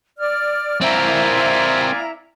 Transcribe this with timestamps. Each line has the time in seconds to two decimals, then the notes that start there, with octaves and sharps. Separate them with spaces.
0.17 D5 F6
0.81 C4 E4 A#4 D5 F5 G#5 A#5